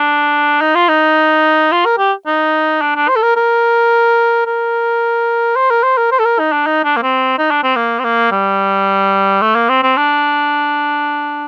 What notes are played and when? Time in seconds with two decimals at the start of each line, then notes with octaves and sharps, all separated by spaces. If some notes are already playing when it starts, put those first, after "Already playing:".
Already playing: D4
0.61 D#4
0.75 F4
0.88 D#4
1.72 F4
1.85 A#4
1.98 G4
2.26 D#4
2.81 D4
2.96 D4
3.09 C5
3.16 A4
3.22 A#4
3.36 A#4
4.46 A#4
5.56 C5
5.71 A#4
5.83 C5
5.97 A#4
6.12 C5
6.19 A4
6.25 A#4
6.39 D#4
6.52 D4
6.66 D#4
6.84 D4
6.96 A#3
7.03 C4
7.38 D#4
7.51 D4
7.63 C4
7.76 A#3
7.99 C4
8.04 A#3
8.32 G3
9.42 A3
9.55 A#3
9.69 C4
9.83 C4
9.97 D4